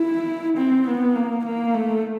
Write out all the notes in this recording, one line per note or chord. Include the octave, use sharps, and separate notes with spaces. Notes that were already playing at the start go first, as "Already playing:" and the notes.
Already playing: E4
C4
B3
A#3
A#3
A3